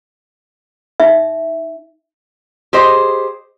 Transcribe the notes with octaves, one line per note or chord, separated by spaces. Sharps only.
D#4 E5
G4 G#4 C5 D#5